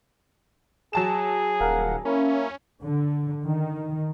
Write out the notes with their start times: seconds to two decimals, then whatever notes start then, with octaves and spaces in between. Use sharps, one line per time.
0.93 F#3 G#4 A5 E7
1.61 D#1 A#4 F5 F#5
2.05 A#3 C#4 E4 A#4
2.82 D3
3.44 D#3